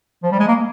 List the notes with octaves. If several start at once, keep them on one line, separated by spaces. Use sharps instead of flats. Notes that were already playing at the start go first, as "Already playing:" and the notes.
F3
G3
G#3
A#3